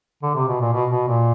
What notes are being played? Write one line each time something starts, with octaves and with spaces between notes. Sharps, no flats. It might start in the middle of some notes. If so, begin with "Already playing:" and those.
D3
C3
B2
A#2
B2
B2
A#2